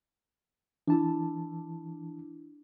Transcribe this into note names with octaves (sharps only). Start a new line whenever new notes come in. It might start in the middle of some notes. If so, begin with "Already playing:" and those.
E3 D4 E4 A5